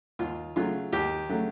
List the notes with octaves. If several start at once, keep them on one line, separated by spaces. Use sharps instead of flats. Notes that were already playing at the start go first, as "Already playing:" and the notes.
D#2 F4
C#3 F#3 A3 F4
D#2 G4
C#3 F#3 A3